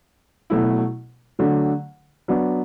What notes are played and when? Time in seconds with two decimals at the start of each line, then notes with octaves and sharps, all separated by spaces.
0.50 B2 F#3 A3 E4
1.39 D3 F#3 A3
2.28 F#3 B3 D4